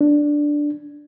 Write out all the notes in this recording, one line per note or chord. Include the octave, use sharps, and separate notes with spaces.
D4